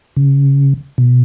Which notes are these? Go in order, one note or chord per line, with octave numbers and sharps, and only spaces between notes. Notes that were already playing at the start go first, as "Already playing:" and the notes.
C#3
B2